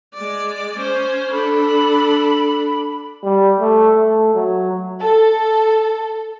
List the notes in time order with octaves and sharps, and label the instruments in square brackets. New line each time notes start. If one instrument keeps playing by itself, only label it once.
[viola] G#3 D5
C#4 C5
[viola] D4 A4 [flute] B5
[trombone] G3
A3
A3
F#3
[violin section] A4